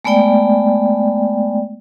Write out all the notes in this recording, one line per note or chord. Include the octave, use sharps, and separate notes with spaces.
G#3 A3 B3 D5 G5